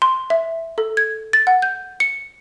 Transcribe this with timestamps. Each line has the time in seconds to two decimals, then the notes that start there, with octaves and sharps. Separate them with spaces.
0.02 C6
0.30 E5
0.78 A4
0.97 G#6
1.33 A6
1.47 F#5
1.62 G6
2.00 C#7